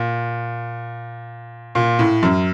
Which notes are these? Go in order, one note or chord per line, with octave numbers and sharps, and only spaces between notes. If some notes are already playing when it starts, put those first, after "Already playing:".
Already playing: A#2
A#2
A2
F#2